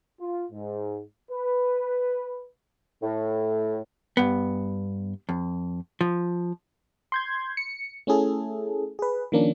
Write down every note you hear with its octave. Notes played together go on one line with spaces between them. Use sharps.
F4
G#2
B4
A2
G2 B3
F2
F3
C6 G6 G#6
C#7
A3 C#4 E4 G#4 A4
G#4 B4
D#3 F3 A#3 C#4 D4